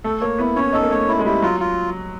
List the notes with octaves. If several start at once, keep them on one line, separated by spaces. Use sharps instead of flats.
A3 A4
A#3 C#5
B3 E4
C#4 C#5
D#4 A4
A#3
A3 C#5
E4
G#3
G3 E4
F#3 F4
F4